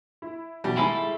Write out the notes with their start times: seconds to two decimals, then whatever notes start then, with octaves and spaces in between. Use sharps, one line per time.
0.22 E4
0.64 B2 E3 F#3 G3
0.77 D#3 G#3 E4 A4 G#5 B5 C7